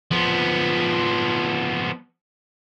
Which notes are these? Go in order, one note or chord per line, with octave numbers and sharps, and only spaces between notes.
F3 B3